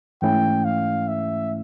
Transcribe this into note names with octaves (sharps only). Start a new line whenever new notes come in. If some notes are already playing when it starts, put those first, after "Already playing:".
G#2 E3 A3 C#4 E4 G5
F5
E5